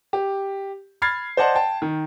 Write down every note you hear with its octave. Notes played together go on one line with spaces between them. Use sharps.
G4
B5 F6 G#6 A6 C7
C5 D5 D#5 F#5 A5 C6
G5 A5
D#3